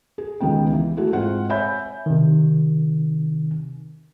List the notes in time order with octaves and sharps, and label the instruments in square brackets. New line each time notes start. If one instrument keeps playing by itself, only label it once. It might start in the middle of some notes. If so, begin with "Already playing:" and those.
[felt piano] G#4
C#2 D#3 G#3 B3 G5
E3
A3 E4 F#4 G#4
G#2 G#3 C4 F4 F#5
C#5 E5 G#5 B5 G6
[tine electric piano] C3 D#3